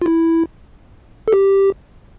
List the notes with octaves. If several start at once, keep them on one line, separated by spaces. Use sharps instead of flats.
F4
E4
A4
G4